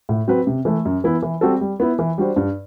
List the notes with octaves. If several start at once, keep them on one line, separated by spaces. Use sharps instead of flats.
A2
F#3 C4 F#4 B4
C3
E3 A3
F#2
E3 B3 E4
E3
G3 C4 F#4 A4
G3
B3 E4
E3
G3 D4 F#4 C5
G2